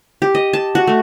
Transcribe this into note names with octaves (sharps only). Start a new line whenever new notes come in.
G4
D#5
A5
F#4
A3